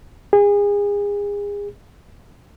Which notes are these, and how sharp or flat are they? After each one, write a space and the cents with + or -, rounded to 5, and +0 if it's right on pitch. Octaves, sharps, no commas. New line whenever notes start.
G#4 -30